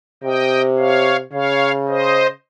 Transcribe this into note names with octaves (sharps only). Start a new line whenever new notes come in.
C3 D#5 G5
C#5 F5
C#3 C#5 F5
C5 D#5